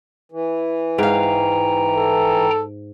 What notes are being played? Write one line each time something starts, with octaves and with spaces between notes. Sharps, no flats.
E3
G#2 F5 G5 A#5
A4